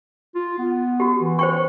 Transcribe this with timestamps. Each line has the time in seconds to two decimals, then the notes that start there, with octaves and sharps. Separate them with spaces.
0.35 F4
0.59 B3
1.00 F#4 G4
1.20 E3
1.39 C5 G5 C#6